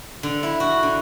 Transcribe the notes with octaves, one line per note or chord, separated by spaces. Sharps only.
D3
E4
F#4
D3